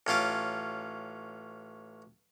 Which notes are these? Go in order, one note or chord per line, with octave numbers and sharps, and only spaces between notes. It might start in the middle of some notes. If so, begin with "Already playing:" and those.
A1 C#4 F4 D6